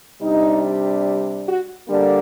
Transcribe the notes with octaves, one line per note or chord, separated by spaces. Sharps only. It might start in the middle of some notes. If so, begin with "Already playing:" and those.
C3 G3 D4 D#4
F#4
D3 G3 A#3 D4